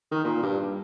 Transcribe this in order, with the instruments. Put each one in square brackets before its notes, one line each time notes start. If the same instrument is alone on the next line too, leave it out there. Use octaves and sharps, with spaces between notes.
[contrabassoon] D#3
A#2
G2